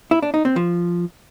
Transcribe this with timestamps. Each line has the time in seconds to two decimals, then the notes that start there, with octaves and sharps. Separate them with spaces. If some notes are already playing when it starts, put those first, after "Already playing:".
0.11 E4
0.22 D4
0.34 D#4
0.45 C4
0.56 F3